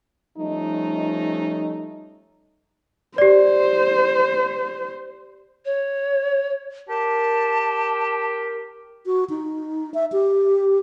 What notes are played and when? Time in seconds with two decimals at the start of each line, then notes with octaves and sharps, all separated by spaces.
0.38 F3 G3 A3 C#4 D#4
3.18 G4 C5 D5
5.65 C#5
6.88 G4 A#4 A5
9.06 F#4
9.30 D#4
9.94 E5
10.12 G4